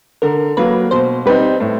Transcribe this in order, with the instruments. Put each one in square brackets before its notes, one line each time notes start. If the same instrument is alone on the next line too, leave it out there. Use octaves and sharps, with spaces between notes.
[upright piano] D3 [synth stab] A#4
[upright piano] F#3 A#3 [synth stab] B4
[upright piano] B2 [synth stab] C5
[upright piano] G3 C4 D#4 [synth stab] B4
[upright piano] A2